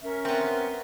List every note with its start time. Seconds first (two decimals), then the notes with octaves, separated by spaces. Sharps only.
0.03 C#4 A#4 E5
0.25 B3 C4